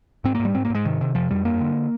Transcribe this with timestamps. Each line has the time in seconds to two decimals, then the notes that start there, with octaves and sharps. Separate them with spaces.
0.24 G#2 C4
0.35 G#2 A#3
0.45 G3
0.55 G#2 C4
0.65 A#3
0.70 G#2 G#3
0.85 C3 D#3
1.01 C3
1.15 F2 F3
1.31 F2 G3
1.45 G2 A#3
1.61 D3